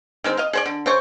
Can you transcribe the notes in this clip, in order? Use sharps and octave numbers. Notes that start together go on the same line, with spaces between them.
D#3 G#3 C4
D#5 F5
G#4 C5 D5
D3
C#3 C5 C#6